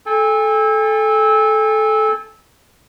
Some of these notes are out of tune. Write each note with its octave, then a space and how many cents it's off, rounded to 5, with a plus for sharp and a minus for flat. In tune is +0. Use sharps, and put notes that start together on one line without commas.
A4 -20 G#5 -40